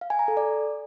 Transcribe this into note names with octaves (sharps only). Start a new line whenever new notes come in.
F5
G#5
A#5
A4
D5